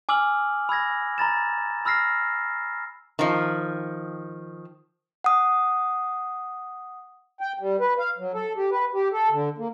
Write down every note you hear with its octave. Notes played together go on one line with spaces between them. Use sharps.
G#5 D6 E6 F6 F#7
B5 E6 G#6 A#6
A#5 B5 A6 E7
B5 E6 F6 A#6 C7
D#3 F3
F#5 D#6
G5
G3
B4
F5
F#3
A4
G4
B4
G4
A4
D3
A#3